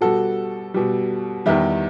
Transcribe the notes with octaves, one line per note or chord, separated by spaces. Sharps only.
B2 G3 F#4 A4
B2 G3
E2 D#3 G3 E4 G4